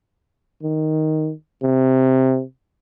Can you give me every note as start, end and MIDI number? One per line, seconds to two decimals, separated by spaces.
0.63 1.32 51
1.62 2.42 48